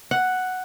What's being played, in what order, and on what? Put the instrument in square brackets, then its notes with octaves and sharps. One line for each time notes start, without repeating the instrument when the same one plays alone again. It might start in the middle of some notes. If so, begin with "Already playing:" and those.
[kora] F#5